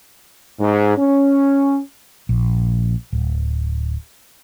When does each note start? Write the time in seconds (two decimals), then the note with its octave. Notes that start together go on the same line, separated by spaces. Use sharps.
0.60 G#2
0.97 C#4
2.29 A#1
3.13 D1